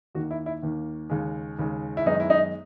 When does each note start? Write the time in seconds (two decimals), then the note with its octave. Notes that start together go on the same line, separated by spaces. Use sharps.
0.15 D#2 D#3 A#3 F#4
0.31 E4
0.46 E4
0.62 D#2 D#3 A#3
1.10 D#2 C#3 G#3
1.59 D#2 C#3 G#3
1.97 E4
2.06 F#2 D#3 G#3 B3 D#4
2.20 E4
2.30 D#4